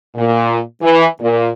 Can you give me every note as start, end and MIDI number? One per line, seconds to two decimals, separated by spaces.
0.16 0.59 46
0.83 1.06 52
1.21 1.49 46